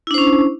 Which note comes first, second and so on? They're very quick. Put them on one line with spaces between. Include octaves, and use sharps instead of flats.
E4 D4 C5 C#4